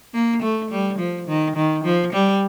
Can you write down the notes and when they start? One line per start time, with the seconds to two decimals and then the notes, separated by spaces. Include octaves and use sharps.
0.14 A#3
0.42 A3
0.71 G3
0.99 F3
1.28 D#3
1.56 D#3
1.84 F3
2.13 G3